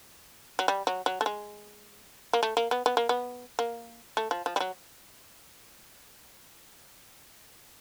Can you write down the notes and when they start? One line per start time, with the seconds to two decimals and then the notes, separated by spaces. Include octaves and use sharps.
0.59 F#3
0.68 G3
0.87 F#3
1.06 F#3
1.21 A3
1.26 G#3
2.33 A#3
2.43 A3
2.57 A#3
2.71 B3
2.86 B3
2.97 A#3
3.09 B3
3.59 A#3
4.17 A3
4.31 F3
4.46 F3
4.56 G3
4.60 F#3